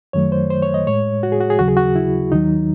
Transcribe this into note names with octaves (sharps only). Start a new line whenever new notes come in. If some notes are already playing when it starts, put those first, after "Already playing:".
F#2 D#3 F#3 A3 C#5
C5
C5
C#5
D#5
A2 G#3 C#5
F#4
G#4
F#4
G#4
D#2 C#3 F#3 F#4
G#4
F#4
E4
D#2 D#3 F#3 D#4